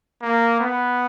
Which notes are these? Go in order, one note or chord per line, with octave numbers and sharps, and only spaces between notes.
A#3
B3